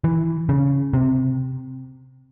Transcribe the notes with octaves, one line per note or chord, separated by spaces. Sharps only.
E3
C#3
C3